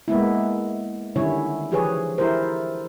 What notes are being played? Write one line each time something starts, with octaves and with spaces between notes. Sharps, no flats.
G#3 A#3 B3 E4
D3 D#3 G3 C#4 E4 C#5
E3 F3 G4 G#4 B4 C#5
E4 G4 A4 A#4 C5